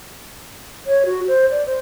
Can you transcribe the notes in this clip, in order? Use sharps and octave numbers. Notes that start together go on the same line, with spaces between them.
C#5
F#4
C5
D5
C5